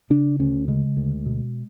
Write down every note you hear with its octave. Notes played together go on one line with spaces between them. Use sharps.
C#3 D4
D2 C#4
C#3 G#3
D2
B2